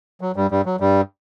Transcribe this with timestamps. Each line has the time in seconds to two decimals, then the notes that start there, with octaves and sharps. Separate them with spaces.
0.21 F#3
0.36 G2 G3
0.51 G2 G3
0.66 F#3
0.80 G2 G3